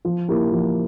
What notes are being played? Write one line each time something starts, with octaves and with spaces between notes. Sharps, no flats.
F3
A#3 E4 G4
F3